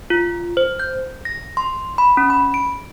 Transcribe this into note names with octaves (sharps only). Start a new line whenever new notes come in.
F4
C5
G6
A#6
C6
B5
C#4
B5
D7